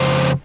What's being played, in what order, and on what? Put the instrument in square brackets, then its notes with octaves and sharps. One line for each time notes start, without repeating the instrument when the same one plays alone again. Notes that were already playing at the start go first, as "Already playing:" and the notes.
Already playing: [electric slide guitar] F2 C#3 C5